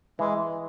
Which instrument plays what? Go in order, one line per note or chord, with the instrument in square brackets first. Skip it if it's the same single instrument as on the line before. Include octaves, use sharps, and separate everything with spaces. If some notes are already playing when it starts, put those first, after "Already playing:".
[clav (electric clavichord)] E3 [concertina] G#3